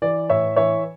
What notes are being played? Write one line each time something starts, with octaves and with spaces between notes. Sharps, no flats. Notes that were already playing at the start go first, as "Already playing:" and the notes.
E3 D5
A2 C#5 E5
E3 C#5 E5